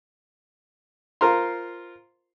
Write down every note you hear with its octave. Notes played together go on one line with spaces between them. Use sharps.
F4 A#4 C5 A#5 C6